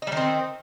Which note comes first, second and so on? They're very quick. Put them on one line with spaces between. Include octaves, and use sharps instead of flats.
D#4 G3 D#3 C4